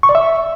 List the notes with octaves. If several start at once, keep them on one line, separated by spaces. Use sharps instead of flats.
C#6
D5
E5